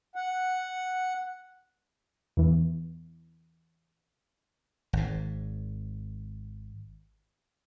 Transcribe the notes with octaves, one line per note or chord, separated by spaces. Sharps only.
F#5
E2 E3
G#1 G#2